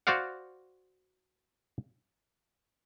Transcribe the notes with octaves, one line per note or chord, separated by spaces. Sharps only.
F#4 C5 D5 F5 F#5